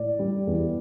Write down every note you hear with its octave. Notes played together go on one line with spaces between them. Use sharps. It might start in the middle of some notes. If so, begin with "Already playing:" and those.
Already playing: A2 D5
G3
E2